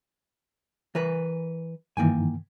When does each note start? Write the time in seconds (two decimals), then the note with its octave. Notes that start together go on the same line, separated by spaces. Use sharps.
0.95 E3 A#4 B4
1.97 G2 D#3 E3 A#3 G5 G#5